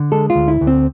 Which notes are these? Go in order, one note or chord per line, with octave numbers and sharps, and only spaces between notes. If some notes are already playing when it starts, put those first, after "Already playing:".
Already playing: D3
G#3 A4
F4
D2
E4
D2
C4